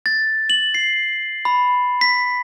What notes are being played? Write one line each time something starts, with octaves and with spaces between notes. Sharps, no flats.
A6
F#7
C7
B5
B6